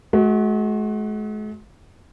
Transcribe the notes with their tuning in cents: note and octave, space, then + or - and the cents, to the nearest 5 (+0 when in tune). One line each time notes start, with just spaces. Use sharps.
G#3 +45 F#4 +0